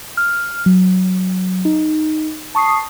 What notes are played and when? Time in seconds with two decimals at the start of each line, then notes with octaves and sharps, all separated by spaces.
0.17 F6
0.66 F#3
1.65 D#4
2.55 A5 C#6 D#6 C7